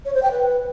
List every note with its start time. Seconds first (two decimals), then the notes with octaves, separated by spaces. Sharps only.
0.05 C#5
0.14 C5
0.23 G5
0.31 B4